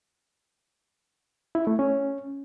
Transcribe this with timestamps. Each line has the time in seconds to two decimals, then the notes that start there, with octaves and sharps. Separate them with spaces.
1.55 E4
1.67 A3
1.79 C#4